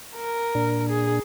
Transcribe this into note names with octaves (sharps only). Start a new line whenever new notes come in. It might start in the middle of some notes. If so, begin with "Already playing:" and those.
A#4
A#2 D4
G#4